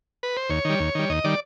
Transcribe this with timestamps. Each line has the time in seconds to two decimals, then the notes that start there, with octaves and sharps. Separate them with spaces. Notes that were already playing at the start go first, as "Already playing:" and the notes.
0.23 B4
0.37 C5
0.49 D#2 C#5
0.65 D#3 G3
0.79 D#2
0.95 D#3 G3
1.09 D#2 D#5
1.24 D#3 G3 D5